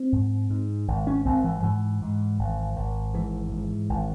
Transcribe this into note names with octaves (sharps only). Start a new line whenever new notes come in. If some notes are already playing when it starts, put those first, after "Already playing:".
Already playing: C4
G#2
G#2
G#1
C#4
G#1 C4
E3
G#2 E3
G#2
G#1
G#1
G#2 E3
G#2
G#1